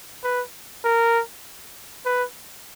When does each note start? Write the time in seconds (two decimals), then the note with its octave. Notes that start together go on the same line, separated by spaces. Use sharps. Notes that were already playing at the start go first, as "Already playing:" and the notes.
0.24 B4
0.84 A#4
2.06 B4